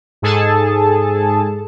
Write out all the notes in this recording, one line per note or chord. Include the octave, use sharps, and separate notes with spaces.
G#2 G#4 A4 A5